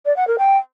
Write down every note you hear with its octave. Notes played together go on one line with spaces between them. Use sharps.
D5
F#5
A#4
G5